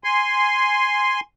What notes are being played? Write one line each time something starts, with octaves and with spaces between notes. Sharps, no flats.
G#5 C6